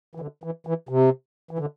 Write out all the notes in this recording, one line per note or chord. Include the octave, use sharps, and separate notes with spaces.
E3
D3
E3
E3
C3
E3
D3